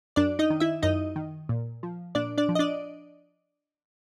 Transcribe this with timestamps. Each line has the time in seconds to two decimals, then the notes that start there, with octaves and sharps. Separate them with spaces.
0.16 F#2 D4 D5
0.39 D#4 D#5
0.50 D#3
0.60 E4 E5
0.82 F#2 D#4 D#5
1.16 D#3
1.49 A#2
1.83 F3
2.15 A#2 D4 D5
2.38 D4 D5
2.49 F3
2.55 D#5
2.59 D4 D5